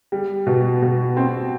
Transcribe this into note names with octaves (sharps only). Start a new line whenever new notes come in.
G3
B2
B2
C4